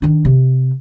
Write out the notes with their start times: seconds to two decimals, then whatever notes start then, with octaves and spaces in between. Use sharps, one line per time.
0.02 D#3 D4
0.25 C3